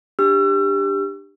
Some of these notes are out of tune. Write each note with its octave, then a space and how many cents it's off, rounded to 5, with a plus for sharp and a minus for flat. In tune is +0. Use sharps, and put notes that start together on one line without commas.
D4 +20 G4 +15 E6 +40